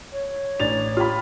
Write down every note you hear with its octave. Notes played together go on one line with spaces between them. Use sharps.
C#5
A1 D4 A6 F7
F4 G4 B5